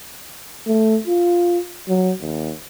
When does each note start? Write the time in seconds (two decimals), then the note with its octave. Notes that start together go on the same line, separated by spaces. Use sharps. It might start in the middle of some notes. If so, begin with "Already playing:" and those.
0.67 A3
1.07 F4
1.88 F#3
2.20 D#2